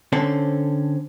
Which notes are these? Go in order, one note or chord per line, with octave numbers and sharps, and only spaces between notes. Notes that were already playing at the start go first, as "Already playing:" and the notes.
D3 C4 C#4 A4